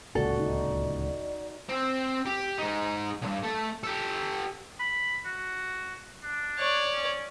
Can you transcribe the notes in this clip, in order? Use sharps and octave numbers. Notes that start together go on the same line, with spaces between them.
D1 C#2 A#2 F#4 A4 D5
D#4
C4
G4
G#3 D#4
B1 G2
A3
G4 A4
B5
F#4
D4
C#5 D5
C#4